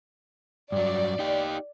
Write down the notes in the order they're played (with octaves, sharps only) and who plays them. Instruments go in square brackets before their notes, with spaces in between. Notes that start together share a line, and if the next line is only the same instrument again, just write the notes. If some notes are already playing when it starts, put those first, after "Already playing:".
[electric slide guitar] G2 F#3 [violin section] D5
[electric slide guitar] D#4 G4